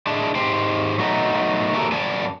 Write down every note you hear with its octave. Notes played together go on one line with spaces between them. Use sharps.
G#3 D4 E4 A5
G#2 G4 C5
F#3 A3 B3 D#4
A#3 E4 F#4 G4 A4 A#4
F#2 B3 D5 G#5 A5